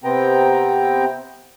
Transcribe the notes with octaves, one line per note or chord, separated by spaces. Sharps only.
C3 B3 C4 G5 A#5